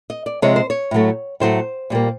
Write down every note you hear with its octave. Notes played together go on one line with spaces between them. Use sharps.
D#5
D5
C3 F3 G#3 C#5
C5
C#5
A2 F#3 A3
A2 F#3 A3 C5
A#2 G3 A#3